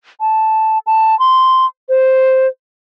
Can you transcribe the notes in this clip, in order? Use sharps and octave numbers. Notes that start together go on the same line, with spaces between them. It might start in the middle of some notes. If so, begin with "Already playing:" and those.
A5
A5
C6
C5